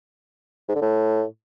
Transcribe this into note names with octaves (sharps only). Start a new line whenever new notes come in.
G#2
D3
A2